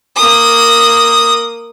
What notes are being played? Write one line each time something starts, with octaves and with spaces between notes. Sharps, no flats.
A#3 D#6